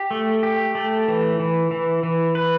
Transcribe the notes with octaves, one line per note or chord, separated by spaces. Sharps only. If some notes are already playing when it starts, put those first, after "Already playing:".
Already playing: G4
A3
G4
A3
E3
E3
E3
E3
B4